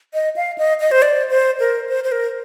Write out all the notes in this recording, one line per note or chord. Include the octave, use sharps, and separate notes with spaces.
D#5
F5
D#5
D#5
C5
D5
C5
A#4
C5
C5
A#4